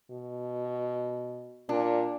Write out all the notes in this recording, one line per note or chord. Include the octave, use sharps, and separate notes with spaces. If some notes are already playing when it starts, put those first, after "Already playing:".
B2
A#2 D4